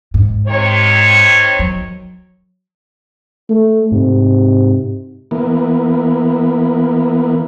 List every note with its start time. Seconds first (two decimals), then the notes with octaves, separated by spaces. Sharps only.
0.14 G#2
0.47 C3 D#3 C#5
1.59 F#3
3.50 A3
3.92 G#2 C3
5.31 E3 A#3 B3